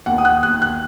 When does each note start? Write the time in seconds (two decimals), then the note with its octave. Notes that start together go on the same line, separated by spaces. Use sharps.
0.06 D#2 F#5
0.18 D#6
0.25 F#6
0.43 D#2 F#6
0.62 F#6